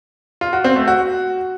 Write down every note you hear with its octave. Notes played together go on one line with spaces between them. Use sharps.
F4
F#4
C4
A3
F#4